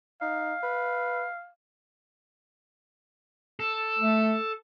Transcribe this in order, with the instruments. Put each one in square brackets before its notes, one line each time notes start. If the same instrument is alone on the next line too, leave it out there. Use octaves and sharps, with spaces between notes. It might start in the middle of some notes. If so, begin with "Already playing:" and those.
[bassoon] D#4 [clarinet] F5
[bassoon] B4
[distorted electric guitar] A4
[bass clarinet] A3